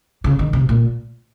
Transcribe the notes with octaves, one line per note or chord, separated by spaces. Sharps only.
C#3
D#3
C3
A#2